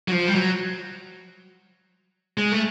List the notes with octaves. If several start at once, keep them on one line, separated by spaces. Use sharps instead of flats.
F#3
F3
G3
F#3
G#3
A3